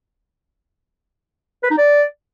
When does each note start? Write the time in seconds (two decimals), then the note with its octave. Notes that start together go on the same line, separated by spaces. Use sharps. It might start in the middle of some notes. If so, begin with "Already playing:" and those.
1.63 B4
1.70 D#4
1.78 D5